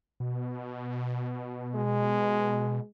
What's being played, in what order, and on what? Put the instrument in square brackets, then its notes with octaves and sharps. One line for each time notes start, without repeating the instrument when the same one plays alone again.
[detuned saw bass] B2
[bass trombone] G#3